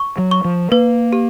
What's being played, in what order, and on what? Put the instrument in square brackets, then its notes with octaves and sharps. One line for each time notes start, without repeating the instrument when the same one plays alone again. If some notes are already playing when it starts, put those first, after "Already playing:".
Already playing: [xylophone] C#6
[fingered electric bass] F#3
[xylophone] C#6
[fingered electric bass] F3
[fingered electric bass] A#3 [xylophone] B4
[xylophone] G4